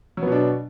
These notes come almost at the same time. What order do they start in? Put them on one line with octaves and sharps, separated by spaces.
F#3 B3 B2 D4